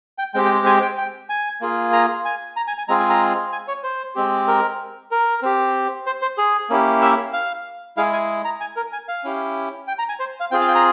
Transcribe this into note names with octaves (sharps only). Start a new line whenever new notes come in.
G5
G#3 C4 G4 G5
G5
G#5
G5
G5
G#5
A#3 F4 G#4
A#5
G#5
A#5
G#5
G#5
G#3 C4 F4 G#4 A#5
G#5
A#5
G#5
C#5
C5
G#3 C4 G4
A#4
A#4
C4 G4
C5
C5
G#4
A#3 C#4 E4 G4
E5
F5
G#3 E4 G#4 F5
G#5
A#5
G#5
A#4
G#5
F5
C#4 E4 G4
G5
A#5
G#5
C5
F5
C4 F4 G#4 G5
F5
G5
A#5